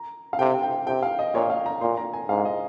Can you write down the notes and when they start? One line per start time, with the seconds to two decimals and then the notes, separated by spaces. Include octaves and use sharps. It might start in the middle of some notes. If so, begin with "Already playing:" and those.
Already playing: A#5
0.33 F5
0.39 C3 G5
0.63 G5
0.87 C3 G5
1.03 F5
1.19 D#5
1.34 A#2 C#5
1.50 F5
1.66 A#5
1.81 A#2 C6
1.97 A#5
2.13 G#5
2.29 G#2 F5
2.45 D#5